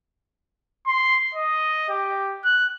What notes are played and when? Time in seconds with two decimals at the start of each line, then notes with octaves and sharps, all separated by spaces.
0.87 C6
1.35 D#5
1.89 G4
2.44 F#6